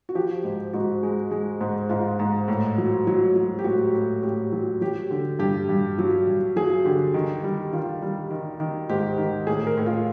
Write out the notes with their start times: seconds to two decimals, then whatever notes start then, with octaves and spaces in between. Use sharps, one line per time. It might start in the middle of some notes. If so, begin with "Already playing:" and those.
0.09 F#4
0.15 F3 G4
0.44 G#2
0.73 G#2 F#4
1.03 G#3
1.31 G#3
1.61 G#2
1.89 G#2 F4
2.19 G#2
2.48 A2
2.78 F#3
3.07 F#3
3.36 F#3
3.59 G4
3.64 A2 F#4
3.94 A2
4.22 A2 G4
4.52 F#3
4.81 F#3 G4
5.11 D3
5.39 G2 G4
5.69 G2
5.98 F#3
6.27 G2
6.56 F#3 G#4
6.85 D3 G4
7.14 D#3
7.43 G3
7.72 D#3 F4
8.02 G3
8.31 D#3
8.60 D#3
8.89 G#2 G4
9.18 D#3
9.47 A2 G#4
9.67 A#4
9.77 A2
9.86 F4